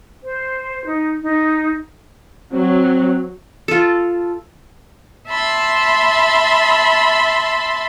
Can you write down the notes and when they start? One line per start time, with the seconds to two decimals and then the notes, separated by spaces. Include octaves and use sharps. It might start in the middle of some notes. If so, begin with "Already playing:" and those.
0.23 C5
0.86 D#4
1.22 D#4
2.53 F#3 C4
3.68 F4 A4
5.28 E5 A5 B5 C6